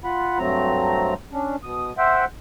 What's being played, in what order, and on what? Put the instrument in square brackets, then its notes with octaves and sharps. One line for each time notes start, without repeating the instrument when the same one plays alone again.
[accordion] F4 F#5 B5
G2 F#3 A3 C4 A#5
C#4 D4
B2 D#6
C5 E5 F#5 G5